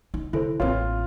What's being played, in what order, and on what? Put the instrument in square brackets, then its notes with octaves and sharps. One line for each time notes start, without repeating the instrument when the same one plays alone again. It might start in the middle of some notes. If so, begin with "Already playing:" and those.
[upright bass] D#4
[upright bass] D3 [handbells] E4 A4 C5
[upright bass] A1 A#3 [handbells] C4 B4 C#5 [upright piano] F4